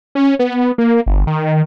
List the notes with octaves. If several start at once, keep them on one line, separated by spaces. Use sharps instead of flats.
C#4
B3
A#3
G1
D#3